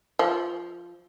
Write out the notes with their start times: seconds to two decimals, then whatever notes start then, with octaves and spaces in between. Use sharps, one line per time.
0.19 F3